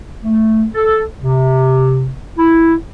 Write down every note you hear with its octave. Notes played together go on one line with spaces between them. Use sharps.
A3
A4
C3
E4